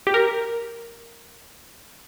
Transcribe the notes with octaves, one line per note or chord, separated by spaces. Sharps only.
G4
A#4